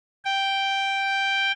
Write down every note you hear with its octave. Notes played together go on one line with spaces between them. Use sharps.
G5